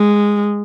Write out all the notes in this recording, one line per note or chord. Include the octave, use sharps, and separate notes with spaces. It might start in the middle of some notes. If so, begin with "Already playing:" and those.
Already playing: G#3